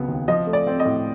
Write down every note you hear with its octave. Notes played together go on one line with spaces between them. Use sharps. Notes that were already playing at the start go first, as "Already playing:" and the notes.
Already playing: C#2 C#3 F#3 B3
D#2
F3 D#5
A3
D5
C4
D#5
A2